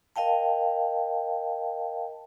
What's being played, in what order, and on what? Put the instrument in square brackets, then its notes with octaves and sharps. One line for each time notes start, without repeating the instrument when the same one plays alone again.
[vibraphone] A#4 D#5 F5 G5 A5